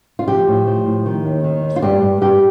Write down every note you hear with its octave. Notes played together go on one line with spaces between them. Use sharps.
F4
F3 G4
A2
F3
A2
D#3
D#2
D#3
D#2
F4
G2 G4
G2
G2 G4